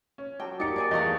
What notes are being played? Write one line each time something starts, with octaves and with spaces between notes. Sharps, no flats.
C#4
F#3 G4 A4 G5
A#3 D#4 G4 D5 C#7
G#4 C#5 D#5 G#5
E2 F#3 A3 G#4 D#5 F5 F#5 C#6